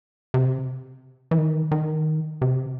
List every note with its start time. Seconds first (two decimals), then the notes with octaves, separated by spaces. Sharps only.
0.34 C3
1.31 E3
1.38 D#3
1.71 D#3
2.42 C3